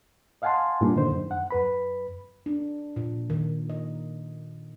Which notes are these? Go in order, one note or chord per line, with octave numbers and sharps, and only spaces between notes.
D#5 F5 F#5 G#5 A5 C6
G2 A#2 G3 A#3 D4 D#4
D3 D#3 D#4 C5
F#2
F#5
F#2 B4 B5
D4
A#2
D#3
D#5